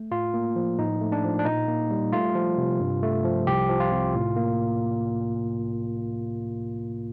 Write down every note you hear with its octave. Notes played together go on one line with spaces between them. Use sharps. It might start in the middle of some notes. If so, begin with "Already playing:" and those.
Already playing: A3
A2 F4
A#3
F3
A2 D#4
A3
D4
F3
D4
A#2 D#4
A#3
G3
A3 F4
F3
C3
G2
A3
F3
C2 G4
F3
F4
C3
A2
A#3